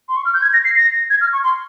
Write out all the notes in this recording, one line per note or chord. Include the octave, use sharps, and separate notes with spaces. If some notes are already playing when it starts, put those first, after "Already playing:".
C6
C#6
F6
G6
G#6
A#6
C7
A#6
G#6
F6
C#6
C6